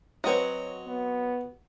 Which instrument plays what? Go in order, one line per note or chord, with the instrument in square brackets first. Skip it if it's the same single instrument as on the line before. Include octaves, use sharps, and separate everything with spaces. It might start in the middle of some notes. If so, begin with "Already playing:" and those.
[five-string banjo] F#3 C4 [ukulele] F#4 B4 [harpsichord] C#5 D#5
[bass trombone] B3